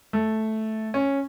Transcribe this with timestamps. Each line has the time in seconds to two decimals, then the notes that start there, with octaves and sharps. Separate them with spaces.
0.13 A3
0.94 C#4